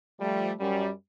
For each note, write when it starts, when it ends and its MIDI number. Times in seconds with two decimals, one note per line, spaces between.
0.20 0.52 53
0.20 0.52 55
0.20 0.52 57
0.59 0.89 42
0.59 0.89 55